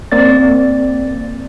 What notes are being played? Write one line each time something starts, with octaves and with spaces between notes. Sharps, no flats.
A#3 C4 D5 A6